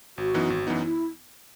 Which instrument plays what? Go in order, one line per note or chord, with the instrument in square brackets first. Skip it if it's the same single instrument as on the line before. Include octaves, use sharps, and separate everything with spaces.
[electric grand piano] G#1 [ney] F#4
[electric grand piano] F#2 E3 B3 D#4
G#1
F#2 E3 B3 D#4
[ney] E4